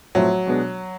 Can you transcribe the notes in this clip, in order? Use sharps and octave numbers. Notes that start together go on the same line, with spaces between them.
A2 F3 F#3 A3 C4
B2 G#3 B3 D4